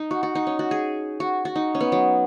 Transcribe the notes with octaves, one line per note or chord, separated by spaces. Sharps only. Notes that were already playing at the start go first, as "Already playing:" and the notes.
Already playing: D#4
F#4
F#4
D#4
C#4
F#4
G#4
F#4
F#4
D#4
C#4
B3
F#3